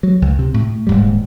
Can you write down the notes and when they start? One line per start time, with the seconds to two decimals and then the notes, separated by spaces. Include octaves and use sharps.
0.03 F#3
0.22 C#2
0.39 C3
0.54 A2
0.87 D#1 G#2 G3